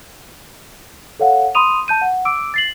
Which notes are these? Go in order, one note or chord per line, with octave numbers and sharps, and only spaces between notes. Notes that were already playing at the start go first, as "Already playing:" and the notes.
A4 C#5 F5 F#5
B5 C6 D#6 D#7 F7
A5 G6 D#7
F#5
D6 E6 D7
A6 C7 F#7